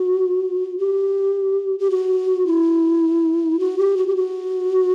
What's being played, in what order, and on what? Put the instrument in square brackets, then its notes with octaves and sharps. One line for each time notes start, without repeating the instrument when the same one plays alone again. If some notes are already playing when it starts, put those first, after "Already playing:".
Already playing: [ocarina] F#4
G4
G4
F#4
E4
F#4
G4
F#4
G4
F#4